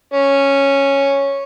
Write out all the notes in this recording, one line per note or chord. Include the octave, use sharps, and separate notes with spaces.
C#4